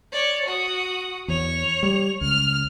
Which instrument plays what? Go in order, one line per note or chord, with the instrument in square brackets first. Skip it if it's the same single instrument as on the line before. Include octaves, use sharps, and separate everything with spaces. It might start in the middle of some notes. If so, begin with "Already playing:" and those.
[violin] C#5 D5
F#4 D#6
[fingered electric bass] E2 [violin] C#5 F7
[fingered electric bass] G3
[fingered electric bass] C#2 [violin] F6